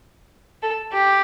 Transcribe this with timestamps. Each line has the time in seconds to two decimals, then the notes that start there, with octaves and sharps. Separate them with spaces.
0.63 A4
0.93 G4